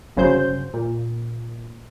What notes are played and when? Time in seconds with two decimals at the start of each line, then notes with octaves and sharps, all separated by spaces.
0.17 G1 C#3 F#3 C5 G6
0.74 A#2